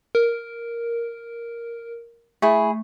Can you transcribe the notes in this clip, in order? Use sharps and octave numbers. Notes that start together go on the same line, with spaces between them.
A#4
A3 E4 G#4